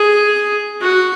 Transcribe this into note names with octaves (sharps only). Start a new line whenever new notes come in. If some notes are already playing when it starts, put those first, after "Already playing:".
Already playing: G#4
F#4